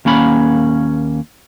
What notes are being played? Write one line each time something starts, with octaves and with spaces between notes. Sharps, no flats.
D#2 A#3 C#4 B5